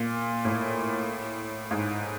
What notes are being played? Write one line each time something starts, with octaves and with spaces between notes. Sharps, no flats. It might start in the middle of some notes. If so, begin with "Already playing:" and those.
Already playing: A#2
A2
G#2